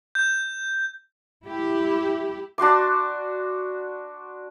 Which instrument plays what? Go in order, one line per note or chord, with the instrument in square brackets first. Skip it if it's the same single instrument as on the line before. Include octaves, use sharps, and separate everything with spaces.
[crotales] G6
[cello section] E4 G4
[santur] D4 F#4 C6 D6